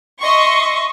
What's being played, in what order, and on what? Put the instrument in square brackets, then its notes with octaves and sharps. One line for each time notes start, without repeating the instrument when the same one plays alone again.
[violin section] D#5 E5 C6 C#6